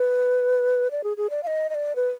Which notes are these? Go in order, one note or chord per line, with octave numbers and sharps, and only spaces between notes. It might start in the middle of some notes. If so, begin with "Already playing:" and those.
Already playing: B4
D5
G#4
G#4
D5
F5
D#5
D#5
D5
B4